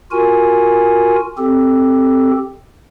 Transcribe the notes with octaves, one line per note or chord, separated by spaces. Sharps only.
F4 F#4 A#4 G#5
C4 G4 A4